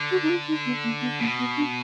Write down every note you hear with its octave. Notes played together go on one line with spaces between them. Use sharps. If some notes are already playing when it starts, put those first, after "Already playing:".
Already playing: D3
F#4
D#4
F4
D#4
B3
A#3
B3
B2 A#3
B3
D4